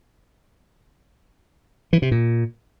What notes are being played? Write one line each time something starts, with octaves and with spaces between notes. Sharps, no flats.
E3
C3
A#2